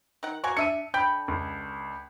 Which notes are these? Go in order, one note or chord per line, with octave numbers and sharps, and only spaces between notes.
D#3 F#5
A#3 F#4 G#5 C#6
D4 E5 C#7 D#7
D3 G5 B5 G6
C#2